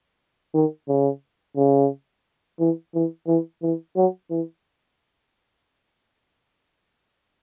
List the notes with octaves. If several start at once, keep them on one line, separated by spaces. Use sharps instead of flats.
D#3
C#3
C#3
E3
E3
E3
E3
F#3
E3